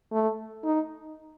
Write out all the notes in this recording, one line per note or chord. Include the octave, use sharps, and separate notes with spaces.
A3
D#4